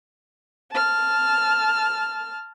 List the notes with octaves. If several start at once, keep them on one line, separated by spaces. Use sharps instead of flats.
A5 F6